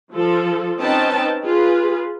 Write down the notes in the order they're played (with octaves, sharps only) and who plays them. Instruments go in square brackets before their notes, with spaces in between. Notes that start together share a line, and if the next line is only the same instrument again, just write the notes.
[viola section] F3 A4
C4 C#4 D#4 B4 G5 A5
F4 G#4 B4